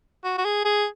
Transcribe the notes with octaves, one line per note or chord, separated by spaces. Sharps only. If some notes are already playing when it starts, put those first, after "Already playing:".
F#4
F#4
G#4
G#4